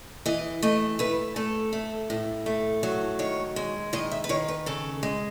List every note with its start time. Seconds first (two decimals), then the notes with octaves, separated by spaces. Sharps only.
0.26 E3 D#5
0.62 A3 D#5
0.99 A3 B4
1.36 A3 A4
1.73 A3
2.10 A2
2.46 A3
2.83 F#3
3.19 D#3 C#5
3.56 G#3
3.93 D#3 D#5
4.11 E5
4.24 B4
4.29 D#3 C#5
4.48 B4
4.66 C#3 A4
5.03 G#3